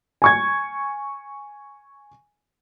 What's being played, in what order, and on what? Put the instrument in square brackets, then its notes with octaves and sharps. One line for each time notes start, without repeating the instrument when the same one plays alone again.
[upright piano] G#5 C#6 G#6